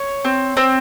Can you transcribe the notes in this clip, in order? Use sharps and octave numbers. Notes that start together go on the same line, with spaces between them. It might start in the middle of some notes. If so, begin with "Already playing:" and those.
Already playing: C#5
C4
C4